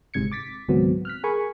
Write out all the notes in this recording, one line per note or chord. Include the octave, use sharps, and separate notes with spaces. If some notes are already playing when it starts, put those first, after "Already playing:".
G1 G#2 C3 G#6 C#7
D6 A6 B6
C#2 G#2 D#3 F#3 B3 C4
F6 F#6 B6
G#4 A#4 G#5 B5 C#6